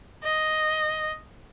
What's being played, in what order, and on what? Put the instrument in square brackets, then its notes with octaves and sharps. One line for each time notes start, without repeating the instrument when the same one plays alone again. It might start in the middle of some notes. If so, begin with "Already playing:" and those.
[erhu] D#5